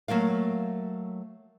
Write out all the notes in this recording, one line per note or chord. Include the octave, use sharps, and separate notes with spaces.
F#3 A3 A#3 F5